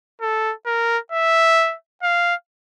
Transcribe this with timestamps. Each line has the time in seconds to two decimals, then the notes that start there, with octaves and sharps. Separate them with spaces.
0.21 A4
0.66 A#4
1.12 E5
2.03 F5